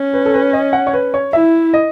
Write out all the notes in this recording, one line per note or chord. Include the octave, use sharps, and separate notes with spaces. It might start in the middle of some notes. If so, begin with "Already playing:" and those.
Already playing: C#4
B4
A4
B4
D#5
F#5
C#5
B4
C#5
E4 E5
D#5